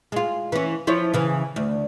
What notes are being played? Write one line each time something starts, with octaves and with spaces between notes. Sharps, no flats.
G#3 F4
E3 C#4
F3 E4 C#5
C#3 E3
D2